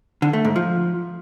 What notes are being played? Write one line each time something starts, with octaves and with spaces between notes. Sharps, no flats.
D3
A3
G#2
F3